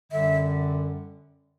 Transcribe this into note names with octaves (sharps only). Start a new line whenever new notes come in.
F#2 D3 G3 E5